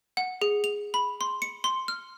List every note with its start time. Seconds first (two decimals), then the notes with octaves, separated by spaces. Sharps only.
0.17 F#5
0.42 G#4
0.64 F7
0.94 B5
1.21 C6
1.42 C#7
1.64 C6
1.88 F6